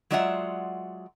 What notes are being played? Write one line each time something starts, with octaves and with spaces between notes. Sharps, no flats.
F#3 G#3 F4 D5 E5 F#5